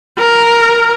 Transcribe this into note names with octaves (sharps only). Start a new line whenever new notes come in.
A#4